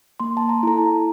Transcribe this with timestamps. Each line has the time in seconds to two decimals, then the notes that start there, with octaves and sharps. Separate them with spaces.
0.20 A#3 C6
0.37 A5
0.49 A#5
0.63 E4 A4 A#5
0.78 A5